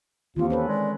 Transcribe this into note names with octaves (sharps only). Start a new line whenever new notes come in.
D#2 D#3 E3 C4 F4
C#4 A4 B4 C5
G#3 D5